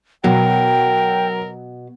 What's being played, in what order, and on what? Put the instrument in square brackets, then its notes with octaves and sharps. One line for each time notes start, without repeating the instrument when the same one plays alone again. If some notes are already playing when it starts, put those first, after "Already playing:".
[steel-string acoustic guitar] B2 [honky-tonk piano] F#3 [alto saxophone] A#4 [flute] G5